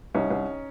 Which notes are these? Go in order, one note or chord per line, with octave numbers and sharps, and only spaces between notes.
C2 C#4 D#4
C2